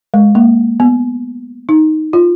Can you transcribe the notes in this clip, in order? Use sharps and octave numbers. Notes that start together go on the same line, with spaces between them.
G#3
A#3
B3
D#4
F4